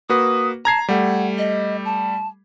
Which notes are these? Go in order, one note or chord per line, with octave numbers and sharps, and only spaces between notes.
A#3 F#4 B4 D#6
A5 A#5 G#6 C7
G3 A3 F#5
D#5
A5